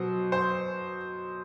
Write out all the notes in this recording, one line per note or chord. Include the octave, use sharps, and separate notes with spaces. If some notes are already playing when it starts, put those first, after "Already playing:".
Already playing: B2 F#3 C5
C5